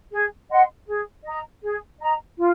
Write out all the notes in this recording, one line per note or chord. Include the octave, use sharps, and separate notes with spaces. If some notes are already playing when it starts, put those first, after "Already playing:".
G#4
D#5 F#5 C6
G#4
D#5 A#5
G#4
D#5 A#5
F4